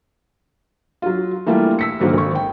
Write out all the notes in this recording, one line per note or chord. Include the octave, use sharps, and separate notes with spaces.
F#3 F4
E3 G3 A3 A#3 D4 F4
E6 B6 C#7
G#2 D3 D#3 F#3 A#3 C4
G#1 C#6
G5